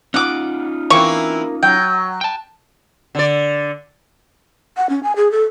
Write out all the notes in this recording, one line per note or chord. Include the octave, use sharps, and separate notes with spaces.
C#4 D#4 F4 F#5 D6
E3 A#3 C4 E4 C#6
F#3 G5
G5 A5
D3 D5
F#5
C#4
G#5
G#4
A4